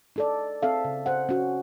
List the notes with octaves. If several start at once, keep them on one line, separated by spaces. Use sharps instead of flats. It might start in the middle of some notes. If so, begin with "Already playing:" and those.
D#4 A4 D5
C4 A4 E5 F5
C#3
C5 F#5
C#4 F#4